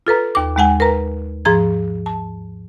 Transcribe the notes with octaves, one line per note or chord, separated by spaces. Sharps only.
F4 A4 B4 A#5
D#2 D6
D#2 G#3 F#5 G#5
A#4 B4 A#5
G#2 F3 G#4 A#5 G#6
A5